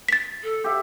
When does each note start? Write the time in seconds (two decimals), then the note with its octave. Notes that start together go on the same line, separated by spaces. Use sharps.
0.09 A6 B6
0.44 A4
0.64 G4 E5